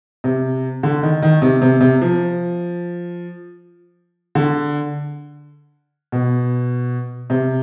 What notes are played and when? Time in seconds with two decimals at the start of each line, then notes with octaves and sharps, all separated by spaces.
0.24 C3
0.83 D3
1.03 D#3
1.22 D#3
1.42 C3
1.62 C3
1.81 C3
2.01 F3
4.35 D3
6.12 B2
7.30 C3